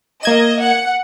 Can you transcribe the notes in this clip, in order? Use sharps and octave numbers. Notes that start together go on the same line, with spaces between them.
A#3 D#5 G#6 E7
F#5